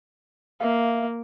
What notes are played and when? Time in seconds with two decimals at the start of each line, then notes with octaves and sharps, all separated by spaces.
0.60 A#3 E5 F5